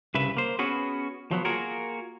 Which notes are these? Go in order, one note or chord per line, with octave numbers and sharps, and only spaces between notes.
C2 C#3 B4 E5
A#3 C5
B3 C#4 F#4 G#4 B4
F3 F#3 B3
A#3 F4 F#4 G#4 A#4